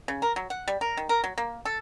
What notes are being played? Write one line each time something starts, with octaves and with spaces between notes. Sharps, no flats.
C#3
A#4
F#3
F#5
G3
A#4
D#3
A#4
F#3
A#3
A4